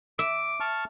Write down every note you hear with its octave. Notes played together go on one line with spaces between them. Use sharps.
E5 D6
A5 C#6 F6